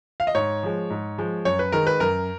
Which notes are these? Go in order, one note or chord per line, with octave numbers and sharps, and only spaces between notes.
F5
D#5
G#2 C#5
F3 G#3
G#2
F3 G#3
F#2 C#5
B4
D#3 G#3 A#4
B4
F#2 A#4